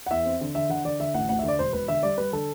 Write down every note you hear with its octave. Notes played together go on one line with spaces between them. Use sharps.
F#5
E2 E5
C4
D3
D3 E5
D3 F#5
D3 D5
D3 E5
A1 F#5
D2 F#5
E5
D3 D5
E1 C5
E1 B4
D3 E5
G3 D5
G3 B4
D3 A4